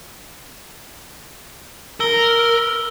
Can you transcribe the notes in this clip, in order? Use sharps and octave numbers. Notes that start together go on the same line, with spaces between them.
A#4 E6 G7